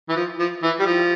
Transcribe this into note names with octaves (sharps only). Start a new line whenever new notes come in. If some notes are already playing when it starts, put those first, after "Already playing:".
E3
F3
F3
E3
G3
F3